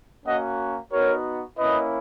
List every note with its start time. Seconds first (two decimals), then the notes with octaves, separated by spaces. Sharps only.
0.26 A#3 C#4 F#4 D#5 F#5
0.91 B3 D#4 F#4 A#4 C#5
1.57 A#3 C#4 E4 B4 D#5